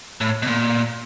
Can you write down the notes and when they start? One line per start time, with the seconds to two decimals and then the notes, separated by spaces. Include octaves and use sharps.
0.21 A2
0.43 B2
0.48 A#2